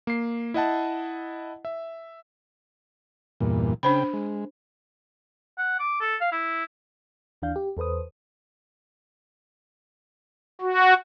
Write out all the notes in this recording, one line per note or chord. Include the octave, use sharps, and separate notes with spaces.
A#3 C7
E4 D#5 F#5 A5
E5
E2 G2 A#2
C#3 D4 C5 G5 B5
G#3
F#5
D6
A4
F5
E4
D#2 E3 D4 F5 G6
G4
E2 A4 B4 C5 D#6
F#4